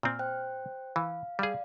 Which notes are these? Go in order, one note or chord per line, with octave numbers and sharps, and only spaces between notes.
A#2 C4 F6
C5 G5 F#6
E3 F5
G3 G#4 D5 F5